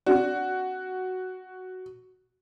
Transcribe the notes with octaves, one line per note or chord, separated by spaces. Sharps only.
C4 D4 F#4 D5